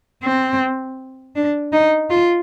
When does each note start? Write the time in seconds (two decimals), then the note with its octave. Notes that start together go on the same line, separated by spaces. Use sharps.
0.24 C4
1.35 D4
1.73 D#4
2.10 F4